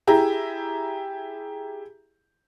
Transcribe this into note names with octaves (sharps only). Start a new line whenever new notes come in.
E4 G4 G#4 A#5